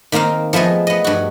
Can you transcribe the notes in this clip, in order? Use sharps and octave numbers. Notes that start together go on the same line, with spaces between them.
D#3 A#3 C4 D#4 F5
F3 A3 B3 G#4 D#5
B3 D#5
G2 F#4